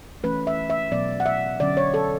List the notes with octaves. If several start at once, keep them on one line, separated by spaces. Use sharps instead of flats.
E3 A3 C#4 B4
E5
E5
B2 F#3 B3 D5
F#5
E5
D3 F#3 C#4 D5
C#5
A4